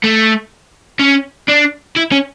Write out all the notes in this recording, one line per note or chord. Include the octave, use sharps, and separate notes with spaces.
A3
C#4
D4
E4
C#4